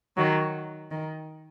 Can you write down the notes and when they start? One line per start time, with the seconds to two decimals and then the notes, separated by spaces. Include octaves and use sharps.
0.17 D#3 F#3
0.90 D#3